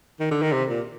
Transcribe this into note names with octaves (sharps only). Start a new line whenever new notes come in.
D#3
D3
D#3
C3
A#2